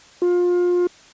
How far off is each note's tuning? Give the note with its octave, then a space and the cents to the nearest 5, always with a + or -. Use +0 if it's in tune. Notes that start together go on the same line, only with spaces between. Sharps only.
F4 +25